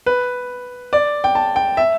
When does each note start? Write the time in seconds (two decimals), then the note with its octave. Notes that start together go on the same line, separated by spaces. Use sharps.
0.06 B4
0.93 D5
1.24 G5
1.35 A5
1.56 G5
1.77 E5